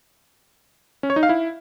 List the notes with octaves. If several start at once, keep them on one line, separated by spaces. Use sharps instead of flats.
C#4
C#5
D#4
F5
E4